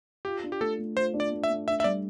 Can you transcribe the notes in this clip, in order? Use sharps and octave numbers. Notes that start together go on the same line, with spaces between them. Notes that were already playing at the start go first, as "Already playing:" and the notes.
F4 G4
D4
G4
A3 A4
A3
F4 C5
D4
D5
A3
E5
A3
D4 E5
E5
G3 D5